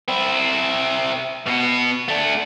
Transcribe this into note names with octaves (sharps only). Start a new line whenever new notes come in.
C4 E4
B2 B3
A3 D4